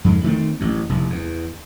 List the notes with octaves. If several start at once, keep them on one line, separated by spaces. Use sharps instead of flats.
F2 G#2 G#3
D#3 A3 C4
A1 F#2
F1 C2
E2